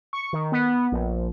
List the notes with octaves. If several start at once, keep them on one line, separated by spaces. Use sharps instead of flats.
C#6
D#3
B3
A#1